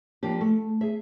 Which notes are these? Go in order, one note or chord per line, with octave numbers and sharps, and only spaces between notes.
F3 A#3 D4 G4
A3
G#4 E5